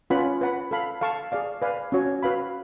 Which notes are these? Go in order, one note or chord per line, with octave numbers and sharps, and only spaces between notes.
C#4 F4 B4 F#5 B5
B4 F#5 B5
A4 F5 B5
A4 F5 A5 C#6
G#4 D5 F5
B4 D5 F5 G#5
C#4 F#4 C#5
F#4 B4 F5 B5